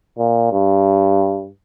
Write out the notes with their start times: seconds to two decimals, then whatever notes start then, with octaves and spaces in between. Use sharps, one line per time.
0.19 A#2
0.52 G2